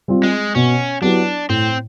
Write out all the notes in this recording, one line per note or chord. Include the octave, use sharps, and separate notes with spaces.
G3 C4 F4
G#3
B2 C#4
F#3 B3 D4 E4 G4
A2 C4